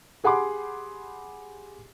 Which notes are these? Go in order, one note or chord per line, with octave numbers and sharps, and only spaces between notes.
G4 G#4 F#5 B5 C6 D6